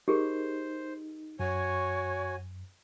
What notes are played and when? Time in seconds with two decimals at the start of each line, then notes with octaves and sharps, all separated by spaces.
0.08 D#4 G4 G#4 A#4 C5
1.40 F#2 F#4 C#5 G#5